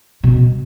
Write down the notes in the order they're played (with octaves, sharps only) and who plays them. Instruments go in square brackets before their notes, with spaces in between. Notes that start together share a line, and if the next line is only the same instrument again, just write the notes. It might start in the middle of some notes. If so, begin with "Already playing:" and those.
[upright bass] B2